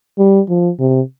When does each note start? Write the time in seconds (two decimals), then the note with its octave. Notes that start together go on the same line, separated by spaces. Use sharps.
0.19 G3
0.49 F3
0.79 C3